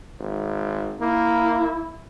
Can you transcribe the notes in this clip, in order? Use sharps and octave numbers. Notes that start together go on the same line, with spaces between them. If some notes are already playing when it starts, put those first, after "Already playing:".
G#1
A#3 E4